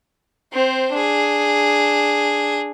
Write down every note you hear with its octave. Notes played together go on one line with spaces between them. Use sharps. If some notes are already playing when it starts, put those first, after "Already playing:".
C4 C5
D4 G#4